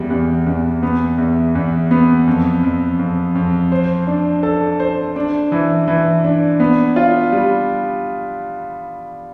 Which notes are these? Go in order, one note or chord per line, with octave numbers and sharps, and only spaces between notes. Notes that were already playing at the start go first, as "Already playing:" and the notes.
Already playing: E2 G3
E2
E2
B3
E2
E2
B3
F2
F2
F2
F2
C5
D4
A4
C5
D4
E3
E3
D4
B3
F4
G3